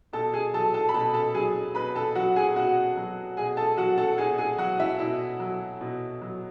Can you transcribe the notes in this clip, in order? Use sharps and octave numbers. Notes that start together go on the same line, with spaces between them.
B2 A4 A5
G#4 G#5
F#3 A4 A5
A4 A5
B5
B2 A4 A5
A4 A5
F#3 G#4 G#5
B2 B4 B5
A4 A5
F#3 F#4 F#5
G#4 G#5
B2 F#4 F#5
F#3
B2 G#4 G#5
A4 A5
F#3 F#4 F#5
A4 A5
B2 G#4 G#5
G#4 G#5
F#3 F#4 F#5
E4 E5
B2 E4 E5
F#3
B2
F#3